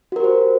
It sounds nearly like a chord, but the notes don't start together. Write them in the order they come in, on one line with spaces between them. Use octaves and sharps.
F#4 A#4 G4 C5